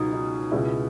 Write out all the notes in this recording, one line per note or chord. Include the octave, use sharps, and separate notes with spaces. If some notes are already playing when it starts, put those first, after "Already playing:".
Already playing: C#2 B2 F#3 D#4
D#4
C#2 B2 G#3 E4